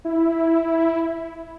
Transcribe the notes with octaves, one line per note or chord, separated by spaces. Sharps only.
E4